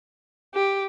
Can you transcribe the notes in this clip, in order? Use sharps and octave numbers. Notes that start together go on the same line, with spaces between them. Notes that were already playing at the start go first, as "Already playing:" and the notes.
G4